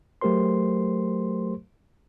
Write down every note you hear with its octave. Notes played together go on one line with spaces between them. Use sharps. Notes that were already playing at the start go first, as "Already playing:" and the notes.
F#3 A3 G4 A#4 C5 C6